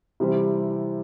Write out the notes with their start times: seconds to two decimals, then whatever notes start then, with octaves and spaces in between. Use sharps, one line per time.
0.20 C3 E3 G3 C4